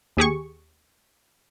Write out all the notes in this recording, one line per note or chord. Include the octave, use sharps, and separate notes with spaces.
D#2 G4 G#4 C#6